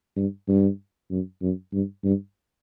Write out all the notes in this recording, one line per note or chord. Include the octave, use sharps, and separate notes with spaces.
G2
G2
F#2
F#2
G2
G2